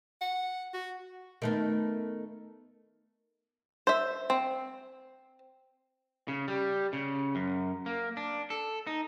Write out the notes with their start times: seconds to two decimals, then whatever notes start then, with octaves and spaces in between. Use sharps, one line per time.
0.21 F#5
0.74 F#4
1.42 D#3 A3 B3
3.87 C5 E5
4.30 C4
6.28 C#3
6.48 G3
6.93 C#3
7.35 F#2
7.86 A#3
8.17 D4
8.50 A4
8.87 D#4